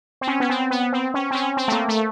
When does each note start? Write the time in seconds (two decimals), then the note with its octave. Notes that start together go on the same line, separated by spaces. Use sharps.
0.21 C4
0.27 C#4
0.40 B3
0.50 C4
0.71 B3
0.93 C4
1.14 C#4
1.31 C4
1.35 C#4
1.57 C4
1.68 A3
1.72 A#3
1.88 A3